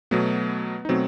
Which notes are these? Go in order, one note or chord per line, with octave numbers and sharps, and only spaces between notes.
B2 F#3 A3 B3
D#4
B2 F#3 A3 C4